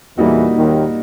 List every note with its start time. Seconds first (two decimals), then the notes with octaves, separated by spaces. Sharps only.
0.18 E2 A#2 E3 G3 A#3 D#4 F#4
0.56 D#2 D#3